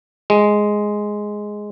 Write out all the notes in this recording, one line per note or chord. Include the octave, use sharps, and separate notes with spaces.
G#3